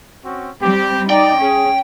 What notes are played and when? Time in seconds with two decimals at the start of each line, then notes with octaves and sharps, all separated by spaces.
0.24 C4 C#4 F#4
0.61 G3 C4 G4
1.10 D#4 D5 G5
1.39 C#4 G#4